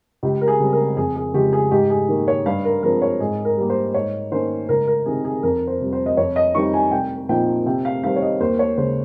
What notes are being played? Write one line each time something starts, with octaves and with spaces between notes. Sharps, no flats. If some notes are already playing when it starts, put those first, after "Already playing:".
C#2 G4
A#4
G#4
C#3 G3 C4
A#4
F2 G#4
G#4
C#3 F3 G#3 G4
G#4
G#2 G4
G#4
D#3 A#3
C#5
G2 F5
A#4
F3 G#3 C4 A#4
C#5
G#2 G#4
A#4
G3 A#3
C5
G#2 C#5
D#3 A#3 C#4 C5
C#2 A#4
A#4
C3 D#3 G#4
G#4
F2 A#4
C5
C3 G3
C5
D#5
F2 C#5
D#5
D#3 G3 C4 D#4 C#6
G#5
C2 G5
A#2 F3 C4 D#4 G5
C3 G5
F5
D#3 G3 C4 F5
C#5
D#5
D#2 C5
C#5
C#3 G#3 C5